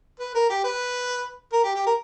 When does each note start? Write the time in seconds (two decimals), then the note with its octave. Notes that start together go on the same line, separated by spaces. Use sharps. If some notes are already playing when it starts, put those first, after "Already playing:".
0.19 B4
0.35 A#4
0.49 G4
0.64 B4
1.52 A#4
1.63 G4
1.75 G4
1.86 A#4